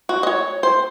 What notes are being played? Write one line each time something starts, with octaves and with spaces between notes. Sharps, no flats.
F#4
D#5
C#5
C5